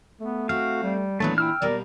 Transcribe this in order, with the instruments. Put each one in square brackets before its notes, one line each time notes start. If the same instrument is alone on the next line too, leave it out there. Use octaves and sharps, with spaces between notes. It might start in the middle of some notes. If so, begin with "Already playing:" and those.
[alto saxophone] A3 [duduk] B3
[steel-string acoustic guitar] C4 [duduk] F#4 [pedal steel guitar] F5
[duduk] G3
[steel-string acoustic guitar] A#2 E3 D4 [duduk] F#3 [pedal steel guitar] A3 B3
[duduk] E4 [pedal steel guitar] G5 E6 F6
[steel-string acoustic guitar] B2 G3 A#3 [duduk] A#4 [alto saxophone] D5